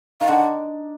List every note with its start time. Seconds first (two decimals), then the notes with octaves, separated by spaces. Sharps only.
0.21 D#3 F5
0.28 D3 F#5